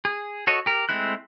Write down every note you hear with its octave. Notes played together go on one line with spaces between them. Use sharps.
G#4
F#4 A4 C#5 D#5
G4 A#4
G#3 A3 C4 E4 F#6